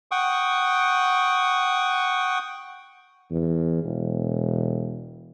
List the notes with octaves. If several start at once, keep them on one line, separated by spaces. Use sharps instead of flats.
F#5 G5 C#6 D#6
E2
E1